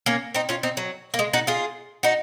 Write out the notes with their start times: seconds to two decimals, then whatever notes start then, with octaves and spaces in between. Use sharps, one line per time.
0.06 A#3 C#4
0.35 C4 D#4
0.49 C#4 F4
0.63 C4 D#4
0.77 F#3
1.14 A#3
1.19 G#3
1.33 D#4 F#4
1.47 F4 G#4
2.03 D#4 F#4